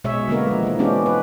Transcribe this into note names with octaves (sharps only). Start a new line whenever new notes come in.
B2 G#3 G#4 C#5 E5
D3 G#3 A#3 B3 A#4
F3 G#3
E3 A#3
G#3 B3 C#4 D4 G4
B4